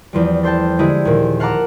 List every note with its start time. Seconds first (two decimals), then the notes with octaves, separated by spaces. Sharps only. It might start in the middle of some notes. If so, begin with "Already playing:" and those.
0.13 E2 F3 G3
0.43 A4 C5 G5 A5
0.79 D3 G#3 E4 G4 G#4
1.05 D#2 A#2
1.40 F5 F#5 A5 A#5 D6